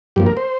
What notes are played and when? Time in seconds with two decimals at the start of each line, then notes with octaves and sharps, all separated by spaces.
0.16 G2 F3 A#3 G4
0.26 A#4
0.37 C5